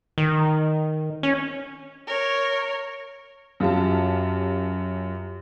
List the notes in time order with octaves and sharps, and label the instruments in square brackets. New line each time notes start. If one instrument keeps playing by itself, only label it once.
[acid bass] D#3
C#4
[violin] A#4 C#5
[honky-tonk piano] F#2 F4 G4 A5